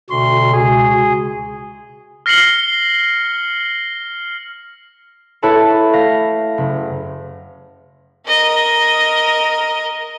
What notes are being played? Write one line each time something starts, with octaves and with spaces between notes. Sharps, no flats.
D2 B2 F#4 C6
C#2 G#4
F6 A#6 C7 C#7 F#7 G7
E4 A4 B4 C#5 A5
A3 F5 A#6 B6
F#1
A#4 D#5